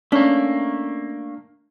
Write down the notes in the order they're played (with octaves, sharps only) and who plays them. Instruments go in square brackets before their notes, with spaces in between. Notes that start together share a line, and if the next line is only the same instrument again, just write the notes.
[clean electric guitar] A3 A#3 [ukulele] C#4 [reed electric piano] D4